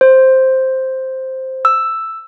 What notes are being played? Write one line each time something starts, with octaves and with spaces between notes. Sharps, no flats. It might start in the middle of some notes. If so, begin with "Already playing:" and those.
C5
E6